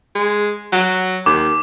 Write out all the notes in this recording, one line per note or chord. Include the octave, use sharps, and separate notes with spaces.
G#3
F#3
D#2 D6